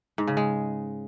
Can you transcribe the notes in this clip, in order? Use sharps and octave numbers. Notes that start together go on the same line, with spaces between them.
G#2
C#3
G#3